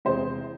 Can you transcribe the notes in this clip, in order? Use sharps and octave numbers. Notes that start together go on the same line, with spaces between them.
E2 C3 G#3 C5